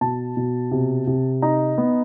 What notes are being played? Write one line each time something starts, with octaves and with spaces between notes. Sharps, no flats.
B2 A5
B2
C3
C3
D#4 A#5
B3